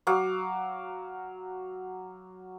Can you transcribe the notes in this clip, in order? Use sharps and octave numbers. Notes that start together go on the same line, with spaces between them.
F#3 F5 D6